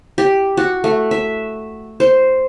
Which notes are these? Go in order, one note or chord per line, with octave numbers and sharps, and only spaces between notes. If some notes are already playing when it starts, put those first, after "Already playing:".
G4
F#4
A3
E5
C5